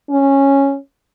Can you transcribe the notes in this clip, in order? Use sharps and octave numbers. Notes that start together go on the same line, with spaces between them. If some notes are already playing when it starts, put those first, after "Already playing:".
C#4